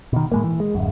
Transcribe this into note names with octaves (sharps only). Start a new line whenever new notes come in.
B2 D#3
A2 G#3 A#3
E3
G#3
D1 G#1 F#2